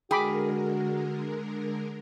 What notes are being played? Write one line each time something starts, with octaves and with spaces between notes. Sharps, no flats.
D3 G#3 F#4 G#4 A#4 G5 B5 D6